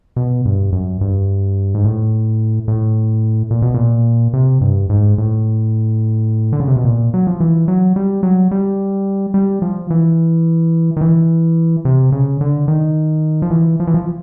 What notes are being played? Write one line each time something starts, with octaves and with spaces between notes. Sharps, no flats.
B2
G2
F#2
G2
G#2
A2
A2
A#2
B2
A#2
C3
G2
G#2
A2
D3
C#3
C3
B2
A#2
F#3
F3
E3
F#3
G3
F#3
G3
G3
F3
E3
D#3
E3
C3
C#3
D3
D#3
F3
E3
F3
E3
F3